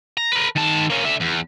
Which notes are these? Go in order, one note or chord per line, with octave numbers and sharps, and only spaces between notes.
A#5
A#4 B4
D#3 A5
A#3 C#4
D3 E5
E2